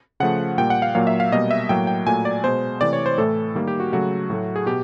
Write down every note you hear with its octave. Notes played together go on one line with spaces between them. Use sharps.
C#3 F3 A3 F#5
A#2 G3 A#3 G5
F#5
F5
A#2 F#3 A#3 F5
E5
F5
B2 G3 A#3 D#5
E5
A2 F#3 A#3 G5
G5
A#2 F#3 A3 G#5
D5
B2 G#3 C5
C3 E3 A3 D5
C#5
C5
A2 E3 A3 A4
D#3 G3 A#3
G4
F#4
C#3 F#3 A3 F#4
A2 F#3 A3
G#4
B2 G4